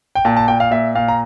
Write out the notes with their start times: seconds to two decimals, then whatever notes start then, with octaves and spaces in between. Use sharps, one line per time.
0.15 G5
0.25 A#2 A5
0.37 A5
0.48 A#2 G5
0.60 F5
0.71 A#2 E5
0.95 A#2 F5
1.08 A#5